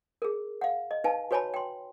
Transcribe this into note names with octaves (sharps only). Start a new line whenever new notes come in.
G#4 A#4
F5 F#5
D#5
D#4 B4 F5 G#5 A5
F#4 B4 C#5 G#5 A5 B5
G5 C6